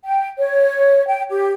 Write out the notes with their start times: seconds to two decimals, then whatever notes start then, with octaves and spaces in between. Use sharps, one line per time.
0.04 G5
0.38 C#5
1.08 G5
1.30 G4